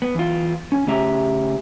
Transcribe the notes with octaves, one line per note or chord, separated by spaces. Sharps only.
B3
E2 F4
C#4
C#3 A3 C#4 G4 E5 A#5